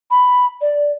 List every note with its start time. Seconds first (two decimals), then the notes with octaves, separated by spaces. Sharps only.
0.11 B5
0.61 D5